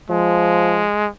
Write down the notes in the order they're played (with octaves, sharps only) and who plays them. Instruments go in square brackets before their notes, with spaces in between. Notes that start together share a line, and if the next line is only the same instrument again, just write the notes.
[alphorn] F3 [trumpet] G#3